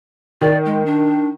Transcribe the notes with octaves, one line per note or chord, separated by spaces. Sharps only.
D#3 D5
G#3
D4